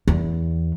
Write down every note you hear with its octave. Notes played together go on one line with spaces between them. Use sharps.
E2